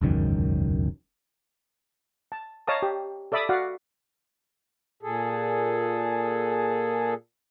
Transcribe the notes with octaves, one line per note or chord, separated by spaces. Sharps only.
E1 C#2 F#2 D#3
A5
C#5 D#5 F5 A5 A#5 D#6
G4
A4 D5 E5 B5 D6 D#6
F#4 D5 F5 F#5
A#2 G#4 A4